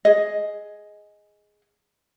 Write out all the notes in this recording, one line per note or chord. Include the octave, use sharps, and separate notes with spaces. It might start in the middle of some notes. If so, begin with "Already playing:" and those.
G#4 D#5